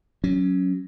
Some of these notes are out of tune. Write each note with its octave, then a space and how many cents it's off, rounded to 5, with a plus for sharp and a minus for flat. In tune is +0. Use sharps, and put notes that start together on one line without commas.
F#3 +0 C#4 +0